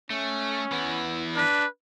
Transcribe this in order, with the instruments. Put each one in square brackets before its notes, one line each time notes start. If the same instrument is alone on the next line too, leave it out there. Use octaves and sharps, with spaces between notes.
[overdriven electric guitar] A3 [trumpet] C#4
[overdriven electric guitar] E3 B3
[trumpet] D4 [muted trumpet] B4